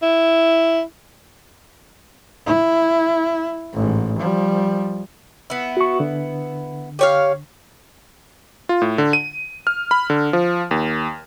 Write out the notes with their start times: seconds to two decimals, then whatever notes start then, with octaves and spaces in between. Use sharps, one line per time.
0.02 E4
2.46 E4
3.74 A1 G#2
4.19 F3 G3
5.50 B3 E4
5.77 F#4 C#6
6.00 D3
6.99 G4 C#5 F5
8.69 F4
8.82 A2
8.98 D3
9.13 D#7
9.67 F6
9.91 B5
10.10 D3
10.33 F3
10.71 D#2